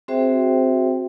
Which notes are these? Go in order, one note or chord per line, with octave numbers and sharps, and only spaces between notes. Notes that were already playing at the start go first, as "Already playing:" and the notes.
C4 F#4 G#4 C5 E5 G5